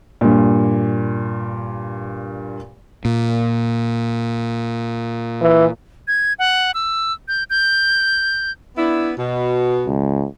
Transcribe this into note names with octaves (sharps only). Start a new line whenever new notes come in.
G2 A#2
A#2
E3
G#6
F#5
E6
G6
G6
B3 D4 E4
B2
C#2